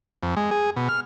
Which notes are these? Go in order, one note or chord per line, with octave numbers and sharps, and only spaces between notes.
F2
G#3
G#4
B2
F6